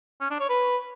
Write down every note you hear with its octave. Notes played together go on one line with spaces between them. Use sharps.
C#4
D4
C#5
B4